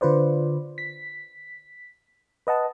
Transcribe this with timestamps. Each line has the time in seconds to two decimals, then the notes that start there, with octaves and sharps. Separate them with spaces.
0.01 D3 F4 B4 C5 D5
0.78 B6
2.47 B4 D#5 F#5 A5